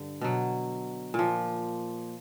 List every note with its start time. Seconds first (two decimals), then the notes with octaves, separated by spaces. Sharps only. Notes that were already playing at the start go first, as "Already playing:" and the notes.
Already playing: G2 D3
0.21 B2 F#3
1.14 A#2 F3